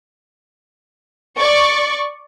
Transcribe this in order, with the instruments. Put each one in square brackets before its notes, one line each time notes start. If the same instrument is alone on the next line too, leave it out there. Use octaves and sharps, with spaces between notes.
[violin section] D5 C#6